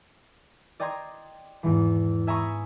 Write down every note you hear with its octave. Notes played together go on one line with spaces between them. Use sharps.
D5 D#5 G5 A#5 C6 G#6
E2 G#2 E3
E5 G#5 A#5 B5 C#6 D#6